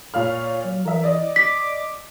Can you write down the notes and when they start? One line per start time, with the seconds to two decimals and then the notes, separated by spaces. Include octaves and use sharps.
0.14 A#2 C#5 F5 F6
0.65 F#3
0.85 E3 A#4 E5
1.03 D5 D#5
1.23 D6
1.36 D6 B6